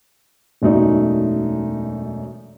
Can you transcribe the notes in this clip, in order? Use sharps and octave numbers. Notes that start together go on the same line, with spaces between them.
E1 F#2 A3 D#4 D5